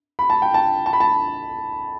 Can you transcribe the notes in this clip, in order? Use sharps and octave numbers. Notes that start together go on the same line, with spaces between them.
B5
A5
G5
A5
A5
B5
A5